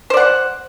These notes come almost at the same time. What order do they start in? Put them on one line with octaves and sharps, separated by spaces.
C5 D5 F#5